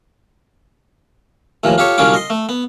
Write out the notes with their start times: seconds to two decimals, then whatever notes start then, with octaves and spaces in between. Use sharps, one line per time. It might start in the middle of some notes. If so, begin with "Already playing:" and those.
1.64 D#2 A2 E3 F3
1.78 F4 G4 A4 C#5
1.98 C2 D3 F#3 C#4 F4 D6
2.14 D#5 C6
2.30 A3
2.49 B3